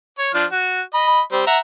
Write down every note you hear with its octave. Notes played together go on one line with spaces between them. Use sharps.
C#5
F3 D4 F6
F#4
D#5 B5
G3 C4 C5
E5 F#5 A#5